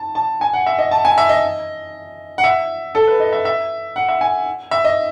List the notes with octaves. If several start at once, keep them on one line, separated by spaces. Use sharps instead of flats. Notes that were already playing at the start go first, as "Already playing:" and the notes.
Already playing: A5
A5
G#5
F#5
E5
D#5
A5
G#5
E5
D#5
F#5
E5
A4
B4
D#5
E5
E5
F#5
E5
G#5
E5
D#5